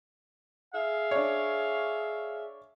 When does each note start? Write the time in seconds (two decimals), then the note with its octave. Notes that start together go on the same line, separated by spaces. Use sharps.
0.74 G#4 E5 F5
1.11 D4 C#5